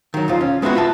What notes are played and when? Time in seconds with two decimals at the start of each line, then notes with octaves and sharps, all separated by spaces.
0.14 D#3 F#3
0.28 B1 E2 F4 C5
0.41 C#4
0.62 G#3 B3 C4 D#4 E4 F#4
0.75 F4 B4 E5 A5